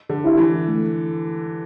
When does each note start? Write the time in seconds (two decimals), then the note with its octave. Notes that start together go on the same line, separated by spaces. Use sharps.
0.09 D3
0.24 E4 G4 E5
0.37 E3
0.67 A3